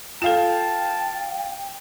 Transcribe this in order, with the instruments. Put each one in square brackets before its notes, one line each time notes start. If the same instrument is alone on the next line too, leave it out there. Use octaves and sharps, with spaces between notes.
[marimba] F4 A4 [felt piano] F5 E7 [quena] G5 [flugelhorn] A5